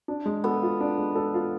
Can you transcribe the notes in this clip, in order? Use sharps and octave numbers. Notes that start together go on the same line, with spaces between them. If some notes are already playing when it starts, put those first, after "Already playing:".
D4
G#3
B3 A4
F4
D4
G#3
A4
F4